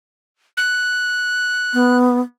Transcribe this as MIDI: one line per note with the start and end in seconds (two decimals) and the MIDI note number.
0.57 1.97 90
1.74 2.19 59